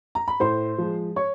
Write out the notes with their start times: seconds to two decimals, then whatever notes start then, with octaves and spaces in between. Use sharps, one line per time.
0.15 A#5
0.28 B5
0.40 A2 C5 C6
0.78 F3 G#3
1.16 C#5 C#6